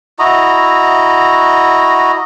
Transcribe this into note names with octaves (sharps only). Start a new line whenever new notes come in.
E4 F#4 D#5 A#5